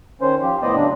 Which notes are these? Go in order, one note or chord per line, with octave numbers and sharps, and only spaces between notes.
D#3 C#4 C5
F3 G4
A2 B3 C5 D5 D#5
C#3 F#3 D4